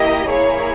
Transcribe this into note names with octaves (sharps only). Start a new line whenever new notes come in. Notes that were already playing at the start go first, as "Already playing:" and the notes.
Already playing: A#3 E4 G4 D#5
A#3 E4 G#4 C#5